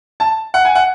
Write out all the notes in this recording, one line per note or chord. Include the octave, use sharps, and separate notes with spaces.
A5
F#5
G#5
F#5